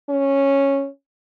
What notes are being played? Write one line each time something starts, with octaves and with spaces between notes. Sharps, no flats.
C#4